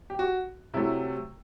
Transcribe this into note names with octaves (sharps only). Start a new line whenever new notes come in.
G4
F#4
C3 F#3 A3 E4